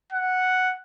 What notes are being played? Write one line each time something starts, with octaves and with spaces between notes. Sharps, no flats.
F#5